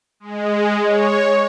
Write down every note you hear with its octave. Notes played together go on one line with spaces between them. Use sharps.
G#3
C#5